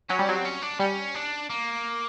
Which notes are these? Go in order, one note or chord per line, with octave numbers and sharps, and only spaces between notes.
F#3 C#4
G3
F#3 C4
C#4
D4
G3 C#4
D4
A#3